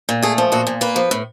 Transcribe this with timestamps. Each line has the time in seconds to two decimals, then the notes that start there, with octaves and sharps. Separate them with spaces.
0.09 A#2
0.22 A3 G#4
0.38 F3
0.52 A#2 F#4
0.67 A#2
0.81 A#3 B4
0.96 F3
1.11 A2